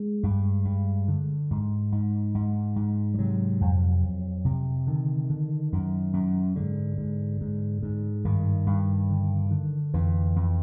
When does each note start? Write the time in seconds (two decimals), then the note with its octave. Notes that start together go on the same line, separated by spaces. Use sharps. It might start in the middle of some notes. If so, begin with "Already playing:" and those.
Already playing: G#3
0.23 G2
0.65 G2
1.08 D3
1.51 G#2
1.92 G#2
2.35 G#2
2.76 G#2
3.14 G3
3.18 C3 F#3
3.61 F2
4.03 F2
4.45 C3
4.87 D3 D#3
5.30 D3
5.72 F#2
6.13 F#2
6.56 G#2 D3
6.98 G#2
7.41 G#2
7.82 G#2
8.25 G2 D#3
8.66 G2
9.10 D3
9.51 D3
9.94 F2 E3
10.36 F2